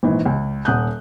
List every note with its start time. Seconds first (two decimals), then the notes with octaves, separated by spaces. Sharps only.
0.03 G#1 A#2 D#3 E3
0.26 C#2
0.65 D#1 F#5 D#6 F#6 G6